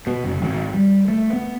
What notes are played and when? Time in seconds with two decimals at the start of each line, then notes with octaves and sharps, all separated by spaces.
0.07 B2
0.24 F#1
0.42 G#1
0.74 G3
1.08 A3
1.33 B3